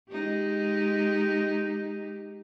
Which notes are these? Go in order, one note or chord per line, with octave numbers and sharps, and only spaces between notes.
G#3 D#4 G4